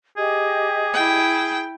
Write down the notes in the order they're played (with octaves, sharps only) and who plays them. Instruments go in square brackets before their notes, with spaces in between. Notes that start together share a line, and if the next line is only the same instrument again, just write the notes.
[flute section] G4 D#5 [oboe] G#4
[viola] E4 G5